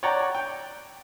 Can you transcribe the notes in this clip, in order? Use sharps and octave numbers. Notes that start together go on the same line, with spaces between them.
C#5 D5 F#5 G5 A#5
G5